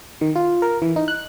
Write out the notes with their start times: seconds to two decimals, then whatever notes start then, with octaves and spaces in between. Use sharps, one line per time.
0.21 D#3
0.36 F4
0.62 A#4
0.82 E3
0.96 D#4
1.08 F#6